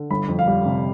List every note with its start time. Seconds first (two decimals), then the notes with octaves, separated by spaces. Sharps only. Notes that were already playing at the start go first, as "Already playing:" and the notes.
Already playing: D3
0.10 G1 B5
0.29 F2
0.39 F5
0.48 G3
0.65 C3